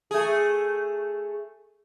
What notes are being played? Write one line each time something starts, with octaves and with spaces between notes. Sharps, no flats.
A3 G#4